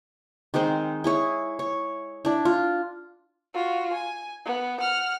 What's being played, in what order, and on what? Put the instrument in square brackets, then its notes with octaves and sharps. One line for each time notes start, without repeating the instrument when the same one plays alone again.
[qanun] D#3 G#3 C4 C5
E4 G#4 C#5
C#5
D4 E4
F4
[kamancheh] F4 F#4
G#5
B3
F#5 F6